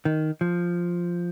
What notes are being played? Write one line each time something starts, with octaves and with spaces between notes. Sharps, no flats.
D#3
F3